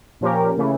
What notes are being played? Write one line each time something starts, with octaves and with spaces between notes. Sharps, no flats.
A#2 F3 C#4 G4 A#4
C#3 E3 A3